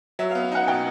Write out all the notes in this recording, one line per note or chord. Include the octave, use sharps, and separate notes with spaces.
F#3 E5
F5
B3
F5
D#4 F#5
B2 G5